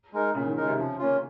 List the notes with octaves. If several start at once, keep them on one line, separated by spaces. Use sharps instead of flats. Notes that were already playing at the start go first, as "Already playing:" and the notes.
G#3 D#4 A#4
A#2 C#3
D#3
D#3 G#3 D#4 A#4
C3
C#3 F3
A#3 C#4 F4